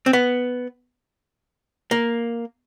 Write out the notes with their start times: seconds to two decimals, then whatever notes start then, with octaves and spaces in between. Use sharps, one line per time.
0.06 C4
0.13 B3
1.91 A#3